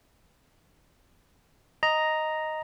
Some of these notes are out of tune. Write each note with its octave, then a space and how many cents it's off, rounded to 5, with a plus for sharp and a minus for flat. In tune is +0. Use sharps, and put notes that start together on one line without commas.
D#5 +0 A#5 +0